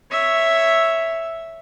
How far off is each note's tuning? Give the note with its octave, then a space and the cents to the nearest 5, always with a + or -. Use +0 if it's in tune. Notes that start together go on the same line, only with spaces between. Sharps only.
C#5 +0 E5 +0